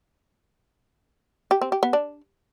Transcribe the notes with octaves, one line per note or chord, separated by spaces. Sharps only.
G4
C4
G4
B3
D4